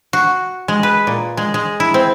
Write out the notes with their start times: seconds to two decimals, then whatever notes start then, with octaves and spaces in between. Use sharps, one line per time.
0.13 F#4
0.68 G#3
0.83 B4
1.07 A#2
1.37 G#3
1.54 G#3
1.80 E4
1.94 C4